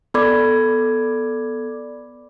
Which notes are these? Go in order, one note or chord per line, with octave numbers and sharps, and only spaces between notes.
B3 A4 D5 B5 D6 G#6